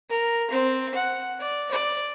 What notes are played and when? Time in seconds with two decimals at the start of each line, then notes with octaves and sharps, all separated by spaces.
0.10 A#4
0.51 C4
0.95 F#5
1.41 D5
1.71 D5